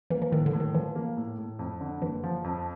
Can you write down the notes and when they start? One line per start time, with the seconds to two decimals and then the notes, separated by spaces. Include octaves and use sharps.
0.10 E3 A#3
0.22 E3
0.32 A2 D#3
0.46 D3
0.53 A2
0.60 D#3
0.75 E3 F3
0.96 A#3
1.17 A2
1.38 A2
1.59 F2
1.81 D3
2.02 F#1 E3
2.24 F3
2.44 F2